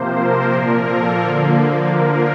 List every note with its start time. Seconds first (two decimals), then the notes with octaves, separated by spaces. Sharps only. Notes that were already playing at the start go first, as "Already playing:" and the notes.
Already playing: C3 F3 A#3 C5
0.18 A#4
0.53 A#2 F3 A#3
0.88 A4
1.23 D3 F3 A#3
1.93 D3 F3 A#3 A#4